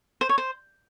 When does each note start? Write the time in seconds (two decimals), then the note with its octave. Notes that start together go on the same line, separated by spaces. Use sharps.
0.21 C5
0.29 C#5
0.38 C5